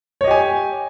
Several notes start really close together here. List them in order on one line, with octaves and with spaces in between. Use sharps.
C#5 D#5 G4 G#5